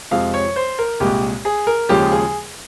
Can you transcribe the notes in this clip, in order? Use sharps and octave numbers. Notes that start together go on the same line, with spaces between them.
F2 C3 F3 G#3 F5
C#5
C5
A#4
C2 A#2 G#3 G4
G#4
A#4
D#2 C#3 F3 G#3 G4
G#4